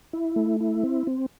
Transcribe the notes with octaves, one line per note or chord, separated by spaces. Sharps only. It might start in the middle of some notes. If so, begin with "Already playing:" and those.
E4
A3
E4
C4
C4